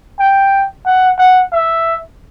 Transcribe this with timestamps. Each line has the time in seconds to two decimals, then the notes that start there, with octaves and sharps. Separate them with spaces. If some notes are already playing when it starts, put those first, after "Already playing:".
0.19 G5
0.86 F#5
1.18 F#5
1.52 E5